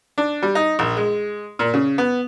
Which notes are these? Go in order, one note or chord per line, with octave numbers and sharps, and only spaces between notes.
D4
G3
D#4
A#1
G#3
A#2
C#3
B3